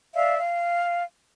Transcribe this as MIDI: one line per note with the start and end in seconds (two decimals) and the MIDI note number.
0.14 0.38 74
0.14 0.38 76
0.14 0.38 77
0.39 1.03 77